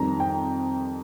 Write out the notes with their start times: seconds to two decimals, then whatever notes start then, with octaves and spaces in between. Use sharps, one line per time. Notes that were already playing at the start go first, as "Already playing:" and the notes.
Already playing: F2 D#3 G3 A#5
0.20 G5